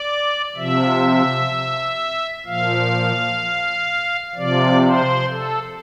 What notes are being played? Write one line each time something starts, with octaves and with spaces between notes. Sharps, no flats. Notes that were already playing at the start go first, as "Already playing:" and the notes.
Already playing: D5
C3 F3 E5
A#2 F3 F5
C3 F3 D5
C5
A4